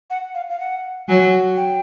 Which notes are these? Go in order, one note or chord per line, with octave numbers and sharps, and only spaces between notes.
F#5
F5
F5
F#5
F#3 G#5
G5